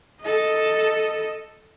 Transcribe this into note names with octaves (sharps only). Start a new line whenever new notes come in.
A4 D#5